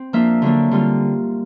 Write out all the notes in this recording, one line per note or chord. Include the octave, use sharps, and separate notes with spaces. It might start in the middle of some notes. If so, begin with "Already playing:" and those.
Already playing: C4
F3 A#3 D4 F4 E5
D3 F#3 A#3 D4
D3 G3 C4 F4